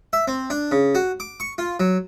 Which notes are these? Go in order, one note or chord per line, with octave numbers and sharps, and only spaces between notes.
E5
C4
D4
C#3
F#4
D6
C#6
F4
F#3